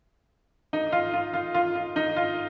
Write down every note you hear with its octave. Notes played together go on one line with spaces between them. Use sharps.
D#4
F4
F4
F4
F4
F4
D#4
F4